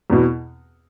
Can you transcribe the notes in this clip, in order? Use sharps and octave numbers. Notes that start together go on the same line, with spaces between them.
E2 B2